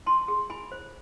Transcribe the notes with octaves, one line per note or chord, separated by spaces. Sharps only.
E4 A5 C6
G#4
E4 G#5 B5
C5